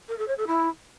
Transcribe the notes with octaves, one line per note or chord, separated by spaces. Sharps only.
A#4
A4
C#5
A4
E4